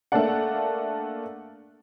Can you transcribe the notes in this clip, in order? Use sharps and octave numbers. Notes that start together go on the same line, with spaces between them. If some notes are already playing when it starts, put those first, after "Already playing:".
A3 A#3 D4 A4 D5 F#5